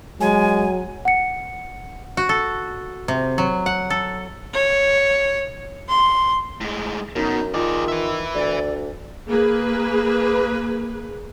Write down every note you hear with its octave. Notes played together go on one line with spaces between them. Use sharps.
F#3 G#3 G#5
F#5 C#7
F#4
A4
C3
F#3
F#5
A4
C#5
C6
A2 G#3
F#2 B2 D#4
D#3 F4 G#4 D5
B4 E5
D2 D5
A#3 G#4 B4